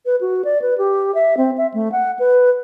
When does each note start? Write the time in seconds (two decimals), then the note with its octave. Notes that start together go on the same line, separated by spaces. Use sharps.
0.06 B4
0.21 F#4
0.44 D5
0.62 B4
0.78 G4
1.14 E5
1.37 C4
1.58 E5
1.74 A3
1.92 F#5
2.19 B4